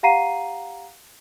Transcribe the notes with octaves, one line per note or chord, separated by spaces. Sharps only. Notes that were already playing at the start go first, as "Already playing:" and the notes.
G4 F5 F#5 A#5 C7 D#7